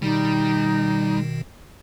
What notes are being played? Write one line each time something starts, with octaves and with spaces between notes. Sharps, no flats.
B2 D#3 G3 D#4